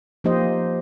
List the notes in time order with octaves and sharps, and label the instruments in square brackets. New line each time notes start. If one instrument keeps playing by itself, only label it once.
[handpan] F3 A#3 D#4 G4 C5 D#5